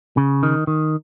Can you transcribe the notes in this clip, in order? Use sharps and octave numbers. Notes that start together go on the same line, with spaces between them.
C#3
D#3
D#3